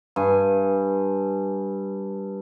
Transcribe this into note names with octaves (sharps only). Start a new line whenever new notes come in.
G2 G#5